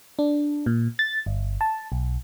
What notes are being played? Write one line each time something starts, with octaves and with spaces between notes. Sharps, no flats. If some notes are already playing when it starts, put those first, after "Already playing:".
D4
A#2
A6
G1
A5
B1